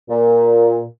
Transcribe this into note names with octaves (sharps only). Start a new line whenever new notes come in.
A#2